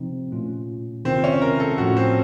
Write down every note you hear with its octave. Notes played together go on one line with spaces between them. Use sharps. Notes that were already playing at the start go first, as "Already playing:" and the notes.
Already playing: C3 F3 C4 D#4
A#2 A3 C#4 F4
C3 D#3 A#3 C4 F4
C#4
A#4
A4
A2 F3 A3 C#4 F4 F#4
C4